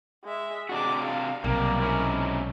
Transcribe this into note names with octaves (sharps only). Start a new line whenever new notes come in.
G#3 E5
C3 G#3 D4 F#4 D6
F5
B1 C3 G3 A#3 A#4 D5
G#2 C#4 E4